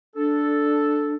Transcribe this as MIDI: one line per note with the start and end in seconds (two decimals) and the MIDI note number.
0.16 1.15 62
0.16 1.17 69